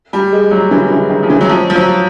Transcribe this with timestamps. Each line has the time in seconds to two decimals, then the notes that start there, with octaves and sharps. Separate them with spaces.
0.13 G3
0.32 G#3
0.51 F#3
0.71 E3
0.90 E3
1.10 D#3
1.23 F3
1.30 E3
1.41 F#3
1.49 F3
1.70 F3
1.75 F#3